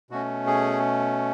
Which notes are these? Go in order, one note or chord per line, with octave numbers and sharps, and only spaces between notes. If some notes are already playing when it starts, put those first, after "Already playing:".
B2 A3 C#4 F#4
G#4